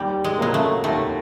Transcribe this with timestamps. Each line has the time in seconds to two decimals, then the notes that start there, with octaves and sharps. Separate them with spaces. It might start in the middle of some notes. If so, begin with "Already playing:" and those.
Already playing: D#2 G3
0.24 G#3
0.39 C#3 F#3 G#3 A#3
0.54 A3
0.84 D#2 A3